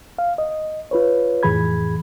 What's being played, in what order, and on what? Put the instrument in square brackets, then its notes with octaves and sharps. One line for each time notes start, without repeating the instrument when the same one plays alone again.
[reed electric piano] F5
D#5
F4 B4 C#5
F2 A2 E3 G#4 B5 G#6